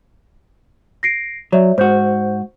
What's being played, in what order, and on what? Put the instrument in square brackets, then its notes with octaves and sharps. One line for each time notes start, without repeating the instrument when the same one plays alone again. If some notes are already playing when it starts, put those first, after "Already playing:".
[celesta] A#6 C7 D7
[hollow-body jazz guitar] F#3 [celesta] C#5 D5 E5
[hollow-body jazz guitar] G#2 F#4 [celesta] C5 G6